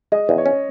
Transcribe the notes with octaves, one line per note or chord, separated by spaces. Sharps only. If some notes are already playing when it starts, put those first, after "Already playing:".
G#3 D#5
E2
C#5
C#4